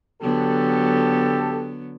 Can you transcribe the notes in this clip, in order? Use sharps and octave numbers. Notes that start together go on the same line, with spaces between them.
D3 F#3 B3 G4 A4